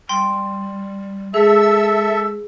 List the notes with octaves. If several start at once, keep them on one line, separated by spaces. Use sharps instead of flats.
G3 G5 C6
G#3 G#4 A4 E5 E6